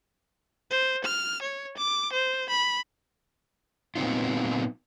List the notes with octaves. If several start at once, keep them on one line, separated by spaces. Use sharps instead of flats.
C5
F6
C#5
D6
C5
B5
A#2 F#3 B3 C4 D#4 F4